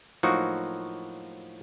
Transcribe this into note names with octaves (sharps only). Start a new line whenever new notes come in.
A2 F3 F#3 A#3 D#4 F#4